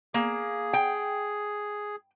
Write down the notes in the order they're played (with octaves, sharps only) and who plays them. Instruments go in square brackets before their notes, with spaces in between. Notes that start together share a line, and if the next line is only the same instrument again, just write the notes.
[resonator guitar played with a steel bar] A#3 [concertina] G#4
[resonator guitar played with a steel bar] G5